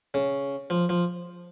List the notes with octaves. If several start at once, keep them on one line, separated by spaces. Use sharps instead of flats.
C#3
F3
F3